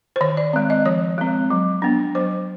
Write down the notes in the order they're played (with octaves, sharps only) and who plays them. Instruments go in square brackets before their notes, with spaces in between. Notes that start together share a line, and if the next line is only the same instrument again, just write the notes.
[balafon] C5
D#3 C#5
D5
G#3 C4
D#5
F3 C#5
G#3 C4
F#3
B3 D4
F#3 C5